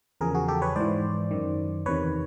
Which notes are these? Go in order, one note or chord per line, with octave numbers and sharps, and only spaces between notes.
E2 C#3 F3 G#4 A#4
F#4 G#4
G4 A4
B4 C#5
G#2 E3 C5 D5
F#2 D#3
E2 C3 D#3 B4 C#5